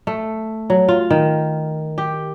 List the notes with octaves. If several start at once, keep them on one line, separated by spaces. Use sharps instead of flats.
A3
F#3
F4
D#3
G4